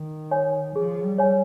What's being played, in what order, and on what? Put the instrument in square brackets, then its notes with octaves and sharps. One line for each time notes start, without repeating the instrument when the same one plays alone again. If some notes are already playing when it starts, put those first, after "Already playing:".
Already playing: [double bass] D#3
[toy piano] C#5 G#5
[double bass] F3 [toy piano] G#4
[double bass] G3
[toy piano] C#5 G#5